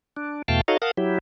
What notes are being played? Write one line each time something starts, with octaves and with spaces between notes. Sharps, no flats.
D4
E2 B2 A3 F5 G5 A5
D#4 F#4 A4 C#5 D#5 F5
A#4 F5 F#5 A5 D#6
F#3 E4 G4